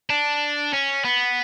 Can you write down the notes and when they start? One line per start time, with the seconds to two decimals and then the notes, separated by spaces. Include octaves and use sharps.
0.10 D4
0.73 C#4
1.05 B3